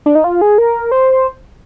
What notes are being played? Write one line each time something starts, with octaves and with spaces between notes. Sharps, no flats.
D4
D#4
F4
G#4
A#4
C5